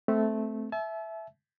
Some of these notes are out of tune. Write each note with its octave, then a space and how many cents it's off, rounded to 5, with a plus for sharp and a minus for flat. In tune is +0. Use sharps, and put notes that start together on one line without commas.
A3 -10 C4 -15
E5 +0 A5 -40